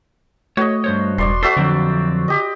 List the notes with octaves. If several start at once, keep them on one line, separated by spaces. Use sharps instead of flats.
A3 F#4 C#5 D#5
G2 C5 C#5
E1 D5 C6
F#4 A4 C5 D5 E5
F2 D3 F#3 C4
G4 D#5